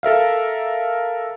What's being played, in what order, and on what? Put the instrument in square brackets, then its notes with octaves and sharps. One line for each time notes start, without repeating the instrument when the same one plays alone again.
[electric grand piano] A4 A#4 E5 F5